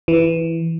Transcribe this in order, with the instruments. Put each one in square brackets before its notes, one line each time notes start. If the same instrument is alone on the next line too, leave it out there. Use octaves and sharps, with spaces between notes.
[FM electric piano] E3